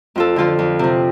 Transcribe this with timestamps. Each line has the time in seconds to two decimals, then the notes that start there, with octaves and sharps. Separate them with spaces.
0.16 F2 F4 A4
0.36 D3 F3 F4 A4
0.59 F2
0.79 C3 F3